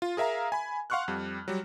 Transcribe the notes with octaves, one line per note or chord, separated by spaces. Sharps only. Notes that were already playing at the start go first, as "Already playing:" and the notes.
F4
G#4 A#4 E5 F5 A#5
G#5 B5
F5 F#5 C6 C#6 F6 F#6
F2 G3
F#3 G3